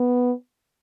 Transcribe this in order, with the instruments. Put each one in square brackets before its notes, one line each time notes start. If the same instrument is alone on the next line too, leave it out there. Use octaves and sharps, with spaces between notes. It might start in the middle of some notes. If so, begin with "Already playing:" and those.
Already playing: [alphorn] B3